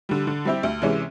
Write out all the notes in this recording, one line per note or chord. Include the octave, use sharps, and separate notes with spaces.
D3 G3
D3
G3 C4 E4 G4
D2
C3 E3 G#3 C#4